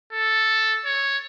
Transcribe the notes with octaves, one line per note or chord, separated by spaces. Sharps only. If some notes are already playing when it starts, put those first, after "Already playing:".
A4
C#5